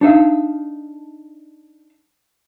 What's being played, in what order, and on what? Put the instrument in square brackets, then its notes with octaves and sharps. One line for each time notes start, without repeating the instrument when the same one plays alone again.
[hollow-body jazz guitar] D4 D#4 E5 F5